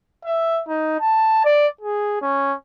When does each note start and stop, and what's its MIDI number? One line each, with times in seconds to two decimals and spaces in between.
0.25 0.61 76
0.68 0.99 63
1.00 1.42 81
1.44 1.67 74
1.81 2.18 68
2.21 2.54 61